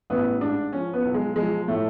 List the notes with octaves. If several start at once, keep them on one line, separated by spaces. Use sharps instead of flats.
A1 B3
G#2 D4
F3 C#4
B3
B1
G#3
F3 G#3
A2 A3